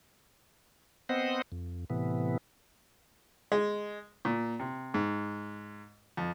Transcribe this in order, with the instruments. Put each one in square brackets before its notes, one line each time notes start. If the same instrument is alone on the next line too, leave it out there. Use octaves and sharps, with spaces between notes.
[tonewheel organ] B3 C4 C5 D#5 F#5
F2
A2 C3 E3 B3
[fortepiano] G#3
A#2
C3
G#2
F2